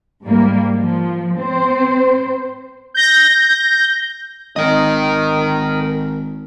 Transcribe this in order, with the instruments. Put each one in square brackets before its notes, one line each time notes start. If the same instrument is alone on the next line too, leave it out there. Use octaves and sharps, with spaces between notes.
[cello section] G#2 G3 A#3
F3
C4 C5
[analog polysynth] G6 A#6
[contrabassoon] G#1 [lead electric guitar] A#4 D#5